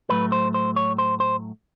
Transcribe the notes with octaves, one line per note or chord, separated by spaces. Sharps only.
A2 F#3 A3 B4
C5
C5
C#5
C5
C5